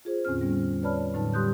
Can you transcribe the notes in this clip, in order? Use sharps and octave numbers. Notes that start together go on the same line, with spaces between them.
F4 G#4 C5
E2 A2 D3 C4 C#4 F6
G3 B3 C#4
B4 C#5 D5 A5 B5 F6
A2 D3 F#3 D#4 B4 A5
G3 G4 C6 D#6 F#6 G6